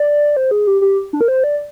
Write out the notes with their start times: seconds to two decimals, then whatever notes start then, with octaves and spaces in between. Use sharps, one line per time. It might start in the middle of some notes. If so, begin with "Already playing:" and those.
Already playing: D5
0.37 C5
0.51 G#4
0.67 G4
0.81 G4
1.13 D4
1.21 A#4
1.28 C5
1.44 D5